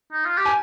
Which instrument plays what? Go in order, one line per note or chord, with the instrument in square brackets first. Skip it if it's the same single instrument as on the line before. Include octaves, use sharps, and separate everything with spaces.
[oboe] D#4
F4
G4
[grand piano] G#5